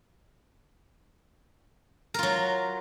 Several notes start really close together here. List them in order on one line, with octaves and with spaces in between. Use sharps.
A#4 F4 F#3